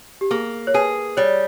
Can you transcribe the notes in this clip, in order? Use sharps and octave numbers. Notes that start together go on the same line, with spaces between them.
G4
A#3 G#4
C#5
G#4 B4
G3 C#5